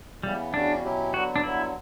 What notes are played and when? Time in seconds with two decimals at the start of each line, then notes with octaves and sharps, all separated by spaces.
0.23 C#3 E3 G3 B3
0.54 E2 C#3 G3 C#4 D4 F#4
0.83 B2 F#3 C#4 E4 G4
1.13 D3 F#3 B3 F#4
1.36 D4
1.44 G2 D3 F#3 B3 E4